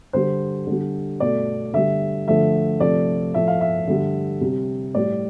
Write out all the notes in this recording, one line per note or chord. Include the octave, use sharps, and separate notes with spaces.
D3 G3 C5
D3 G3
B2 A3 D5
D3 G3 E5
D3 F3 A3 E5
C3 F3 A3 D5
A2 F3 A3 E5
F5
E5
D3 G3
C3 G3
A2 G3 D5